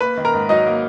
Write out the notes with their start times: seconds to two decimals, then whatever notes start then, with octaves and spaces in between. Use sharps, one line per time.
0.01 A#3 B4 B5
0.17 D#3
0.25 A#4 A#5
0.34 G#2
0.49 F#3 D#4 D#5
0.67 A#3